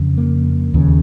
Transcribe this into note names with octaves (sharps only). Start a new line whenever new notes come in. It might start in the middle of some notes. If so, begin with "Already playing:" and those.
Already playing: F2 C#3
A#3
D#2 C#3